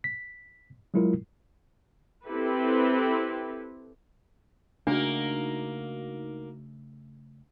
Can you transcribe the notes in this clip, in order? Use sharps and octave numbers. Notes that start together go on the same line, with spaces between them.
B6
F#3 G#3 E4 F4 A#4
C4 E4 G4 A4 B4
C#3 A3 A#3 D4 D#4 F#4 A#4